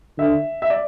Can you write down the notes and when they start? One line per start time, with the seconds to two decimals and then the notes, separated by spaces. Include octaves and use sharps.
0.19 D3 E5
0.62 E5
0.70 D5